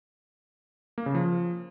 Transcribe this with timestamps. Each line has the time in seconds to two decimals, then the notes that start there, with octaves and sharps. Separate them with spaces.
0.98 A#3
1.06 C#3
1.15 F3